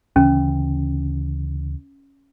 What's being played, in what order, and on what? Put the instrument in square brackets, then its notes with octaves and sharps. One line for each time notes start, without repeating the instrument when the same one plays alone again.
[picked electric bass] D2 C#3 E3 [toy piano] C#4